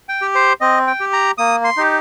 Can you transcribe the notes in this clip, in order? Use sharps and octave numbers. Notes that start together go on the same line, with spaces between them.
G5
G4
C5
C4 D#5
G5
G4
A#5
A#3 D#6
C6
D#4 G4